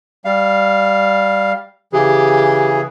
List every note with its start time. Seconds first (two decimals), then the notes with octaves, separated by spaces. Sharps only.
0.25 G3 F5
1.93 C#3 E3 G4 G#4